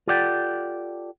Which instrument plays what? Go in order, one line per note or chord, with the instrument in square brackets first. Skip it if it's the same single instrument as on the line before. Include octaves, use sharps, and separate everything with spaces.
[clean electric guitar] F4 G4 A4 D5 F#5 G5